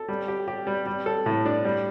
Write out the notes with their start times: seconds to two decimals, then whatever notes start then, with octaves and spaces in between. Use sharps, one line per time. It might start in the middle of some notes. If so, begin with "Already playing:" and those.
Already playing: A4
0.08 G3
0.28 G4
0.48 G4
0.67 G3
0.86 G3
1.06 A4
1.26 A2
1.45 D4
1.65 G3